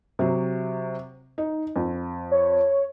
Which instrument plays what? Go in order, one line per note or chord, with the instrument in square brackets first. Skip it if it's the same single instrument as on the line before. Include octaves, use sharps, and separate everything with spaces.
[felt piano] C3 F#3
D#4
F2
[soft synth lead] C#5